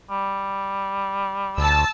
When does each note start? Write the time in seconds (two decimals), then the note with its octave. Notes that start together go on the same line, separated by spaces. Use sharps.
0.10 G3
1.58 D2 A5 E6